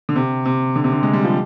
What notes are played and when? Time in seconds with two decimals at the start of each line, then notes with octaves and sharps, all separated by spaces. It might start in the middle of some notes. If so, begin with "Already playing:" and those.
0.09 D3
0.16 C3
0.46 C3
0.76 D3
0.84 C3
0.92 D3
1.03 G#3
1.13 G3
1.24 F3